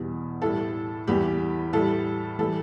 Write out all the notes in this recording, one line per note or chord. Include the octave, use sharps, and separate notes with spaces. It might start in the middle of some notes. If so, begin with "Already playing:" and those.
Already playing: E2 B2 G3
A2 G3 A4
E2 E3 G3 G4
A2 G3 A4
E3 G3 A4